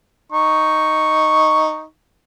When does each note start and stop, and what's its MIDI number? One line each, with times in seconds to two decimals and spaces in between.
0.32 1.84 63
0.32 1.84 85